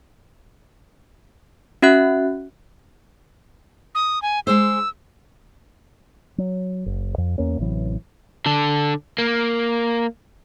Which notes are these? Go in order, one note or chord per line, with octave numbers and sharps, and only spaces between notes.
C#4 F#4 E5 F#6
D#6
G#5
G#3 G#4 C5 E6
F#3
F#1
F2
E2 A#3 C#4
A1 C3 E3 F#3
D3 A4
A#3